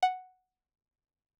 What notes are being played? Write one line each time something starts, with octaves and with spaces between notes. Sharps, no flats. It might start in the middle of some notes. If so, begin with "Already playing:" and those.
F#5